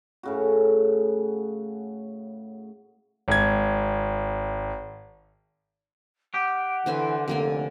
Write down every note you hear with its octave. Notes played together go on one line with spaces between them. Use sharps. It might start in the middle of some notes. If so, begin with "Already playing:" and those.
A2 C#3 F#4
G#1 G#6
G4 F#5
D3 E3 C5 G#5
F1 D3 A#3 G#5